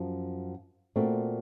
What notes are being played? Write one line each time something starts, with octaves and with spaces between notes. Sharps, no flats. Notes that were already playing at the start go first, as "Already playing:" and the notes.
Already playing: F#2 F3
A#2 A3 C4 F#4